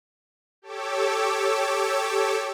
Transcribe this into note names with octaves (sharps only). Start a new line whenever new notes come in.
G4 A4 C#5 D6 E6